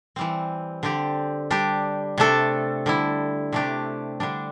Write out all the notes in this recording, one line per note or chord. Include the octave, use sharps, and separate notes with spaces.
E3 G3 C4
D3 C4 G4
G3 D4 G4
C3 A3 D4 A4
D3 G3 E4
C3 A3 D4 G4
D3 G3 D4